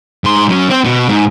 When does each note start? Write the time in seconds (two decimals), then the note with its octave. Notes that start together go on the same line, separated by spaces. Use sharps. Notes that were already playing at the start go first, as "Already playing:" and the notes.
0.24 G#2 C6
0.49 F#3 C#4
0.70 C4 C5
0.85 B2 B3
1.09 G#2